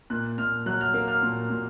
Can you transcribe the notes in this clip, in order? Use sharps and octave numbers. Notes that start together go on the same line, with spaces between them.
A#2 F#6
A#2 F6
F#3 F#6
F6
A#3
F6
A#2
A#2